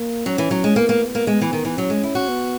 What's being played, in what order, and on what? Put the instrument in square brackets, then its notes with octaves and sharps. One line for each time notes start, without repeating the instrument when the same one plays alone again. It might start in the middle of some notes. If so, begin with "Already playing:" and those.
Already playing: [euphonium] A#3
[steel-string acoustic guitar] F#3 [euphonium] C#4
[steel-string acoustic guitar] E3
F#3
G#3
[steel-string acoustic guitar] A#3 [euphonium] B3
[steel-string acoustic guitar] A#3
A#3
G#3
E3
D#3
E3
[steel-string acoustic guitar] F#3 [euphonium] C#4
[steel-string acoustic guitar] G#3
E4
F#4
[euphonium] B3